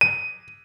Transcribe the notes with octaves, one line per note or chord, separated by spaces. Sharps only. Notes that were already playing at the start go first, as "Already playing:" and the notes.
D#7